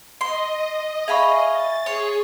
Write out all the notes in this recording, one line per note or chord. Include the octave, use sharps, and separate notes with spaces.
D#5 C6
G#4 E5 F5 G#5 B5 C#6
A6
G#4 C#5 C6